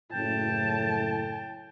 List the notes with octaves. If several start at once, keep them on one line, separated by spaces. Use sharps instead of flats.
F#1 A2 G5 A5